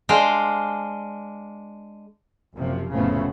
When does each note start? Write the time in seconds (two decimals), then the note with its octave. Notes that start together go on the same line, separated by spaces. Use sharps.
0.09 G#3 D4 C5 F5 G5
2.56 F#1 C3 F3
2.92 F1 A2 C#3 F3 A3 B3